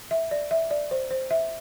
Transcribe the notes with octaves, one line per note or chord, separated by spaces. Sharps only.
E5
D5
E5
D5
C5
C5
E5